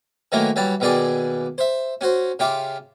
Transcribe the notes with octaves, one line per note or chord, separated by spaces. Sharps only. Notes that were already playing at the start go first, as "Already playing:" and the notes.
D#3 E3 F#3 A3 A#3 E4
E3 F#3 G3 A5
D#2 B2 E3 G#4 D5 G5
C5 E5
C#4 F#4 C5
C#3 F4 G4 E5 D6